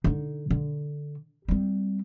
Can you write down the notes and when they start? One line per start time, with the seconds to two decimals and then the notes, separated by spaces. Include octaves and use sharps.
0.04 D3 D#4
0.50 D3
1.48 G3 C4